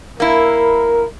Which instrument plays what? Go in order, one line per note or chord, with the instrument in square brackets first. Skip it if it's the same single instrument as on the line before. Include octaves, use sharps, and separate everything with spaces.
[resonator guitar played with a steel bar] A#3 E4 [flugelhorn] A#4